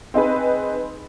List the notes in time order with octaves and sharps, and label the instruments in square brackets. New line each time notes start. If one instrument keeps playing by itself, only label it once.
[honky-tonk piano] C4 D#4 G#4 B4